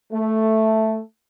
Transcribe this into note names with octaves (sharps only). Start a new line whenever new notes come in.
A3